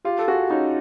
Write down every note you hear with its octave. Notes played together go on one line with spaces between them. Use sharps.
F4 G4
A4
F#4 G#4
C#4 D#4